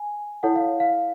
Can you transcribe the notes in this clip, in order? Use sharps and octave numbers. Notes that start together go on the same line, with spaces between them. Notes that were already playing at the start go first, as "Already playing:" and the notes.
Already playing: G#5
E4 A4 C#5 F#5
F5
F5